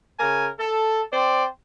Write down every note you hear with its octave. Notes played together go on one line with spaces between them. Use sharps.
C#3 A#4 G#5
A4
C4 C5 D5